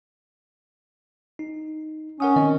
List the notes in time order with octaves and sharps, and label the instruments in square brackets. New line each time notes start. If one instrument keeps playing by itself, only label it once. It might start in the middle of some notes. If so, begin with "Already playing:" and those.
[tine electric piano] D#4
[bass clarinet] C#4 [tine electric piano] A#4 F#5 D#6
[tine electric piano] D#3 C4 D#5